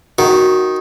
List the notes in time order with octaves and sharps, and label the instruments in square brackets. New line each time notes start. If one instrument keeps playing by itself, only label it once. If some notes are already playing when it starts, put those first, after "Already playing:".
[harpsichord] D#3 [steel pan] F#4